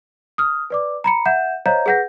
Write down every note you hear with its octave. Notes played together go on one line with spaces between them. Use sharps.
D#6 F6
B4 D5 D6
A#5 B5 C#7
E5 F#5 G6 E7
C5 C#5 D#5 F5 A#5 G6
G#4 B4 F#5 G6 A#6